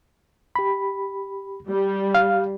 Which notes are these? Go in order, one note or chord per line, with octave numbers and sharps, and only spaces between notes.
G4 B5
G3
F5